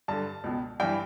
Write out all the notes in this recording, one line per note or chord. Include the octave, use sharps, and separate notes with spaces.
G2 D3 A5
C#2 B2
G2 E3 G5